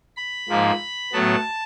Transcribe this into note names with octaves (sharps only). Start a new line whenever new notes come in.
B5
G#2 F3 A#3
A2 F#3 B3 A5